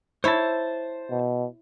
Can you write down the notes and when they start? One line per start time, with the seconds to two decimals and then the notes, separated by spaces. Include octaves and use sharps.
0.24 E4 C5 C#5 A5
1.10 B2